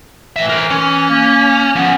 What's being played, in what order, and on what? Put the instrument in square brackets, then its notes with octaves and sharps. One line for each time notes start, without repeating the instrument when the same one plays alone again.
[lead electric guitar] A2 E5 [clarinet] E3
[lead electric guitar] A#4 C5
C#4
[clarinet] A#3
[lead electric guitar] F3 C#4 [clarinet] B3